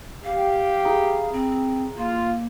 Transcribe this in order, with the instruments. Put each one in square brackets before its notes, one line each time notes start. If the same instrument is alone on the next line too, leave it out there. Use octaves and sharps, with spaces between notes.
[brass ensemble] G4 [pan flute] F5
[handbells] E4 G#4 A#5
[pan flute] C4
[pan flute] A#3 [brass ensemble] F4